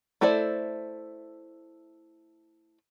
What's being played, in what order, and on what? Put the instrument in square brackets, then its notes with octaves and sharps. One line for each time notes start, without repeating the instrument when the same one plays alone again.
[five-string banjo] A3 E4 A4 C5 D5